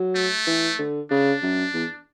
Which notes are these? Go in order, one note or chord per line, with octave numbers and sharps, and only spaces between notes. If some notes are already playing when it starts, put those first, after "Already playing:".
Already playing: F#3
A3
E3
D3
C#3 D4
F#2
E2